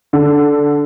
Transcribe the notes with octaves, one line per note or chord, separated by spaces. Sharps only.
D3